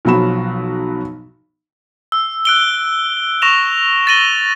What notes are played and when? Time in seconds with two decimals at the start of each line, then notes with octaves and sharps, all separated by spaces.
0.05 B1 F3 F#3 F#4 B5 E7
2.12 E6
2.45 F#6 D7 G7
3.42 C#6 A#6 E7 F7
4.07 A6 A#6 D#7 F#7 G7